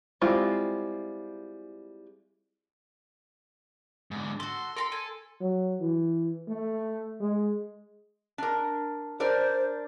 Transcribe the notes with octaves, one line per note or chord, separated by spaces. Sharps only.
G3 G#3 C4 E4 F4
G#2 D3
F#4 A4 C6
A4 A#4 A#5 C6
G#5
F#3
E3
A3
G#3
D4 A#4
D4 A#4 C5 D5